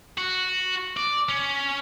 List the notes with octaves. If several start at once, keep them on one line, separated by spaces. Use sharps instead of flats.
F#4
D5
C#4